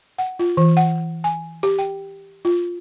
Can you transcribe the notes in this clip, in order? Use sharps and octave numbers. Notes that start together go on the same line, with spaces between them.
F#5
F4
E3
F#5
G#5
G4
G5
F4